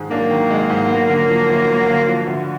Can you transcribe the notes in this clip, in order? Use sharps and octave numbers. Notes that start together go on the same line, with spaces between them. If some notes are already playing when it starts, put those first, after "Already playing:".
Already playing: G#2 D#3 G#3
F#3 A#3 D4
D#3
G#3
G#2
B3
D3
F3
D2
B3
D3
F3
D2